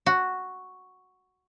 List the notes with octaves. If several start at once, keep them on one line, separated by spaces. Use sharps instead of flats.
F#4